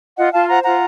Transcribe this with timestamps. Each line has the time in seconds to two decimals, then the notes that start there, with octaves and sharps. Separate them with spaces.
0.17 F4 D#5 F#5
0.33 F4 F5 A5
0.48 C5 F#5 A#5
0.64 F4 F#5 A#5